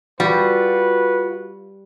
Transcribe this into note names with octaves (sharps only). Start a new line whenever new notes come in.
G3 F4 F#4 B4